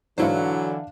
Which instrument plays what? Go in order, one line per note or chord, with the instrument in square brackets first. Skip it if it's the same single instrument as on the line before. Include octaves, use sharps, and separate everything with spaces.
[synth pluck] G#2 E4 C5 [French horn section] D3 E3 [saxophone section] F#3 [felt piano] D4 F5